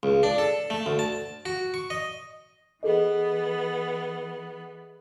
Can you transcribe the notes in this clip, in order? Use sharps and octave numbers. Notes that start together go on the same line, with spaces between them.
C#2
D4
A4
A3
D2
A5
F#4
C#6
D#5
E3 B3 G#4 A4 D#5